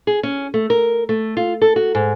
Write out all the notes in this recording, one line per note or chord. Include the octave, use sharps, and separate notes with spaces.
G#4
C#4
A3
A#4
A3
F4
A4
F#4
G#2